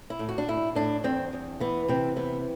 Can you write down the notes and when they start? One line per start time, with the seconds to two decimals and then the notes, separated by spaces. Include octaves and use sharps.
0.10 E4
0.19 A2
0.29 F#4
0.38 D4
0.48 A2 E4
0.75 A2 D4
1.04 E2 C4
1.33 E2
1.60 E3 B3
1.88 C3 C4
2.16 E3 B3